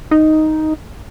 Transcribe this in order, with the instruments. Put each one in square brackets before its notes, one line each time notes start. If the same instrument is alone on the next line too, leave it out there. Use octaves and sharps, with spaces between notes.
[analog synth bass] D#4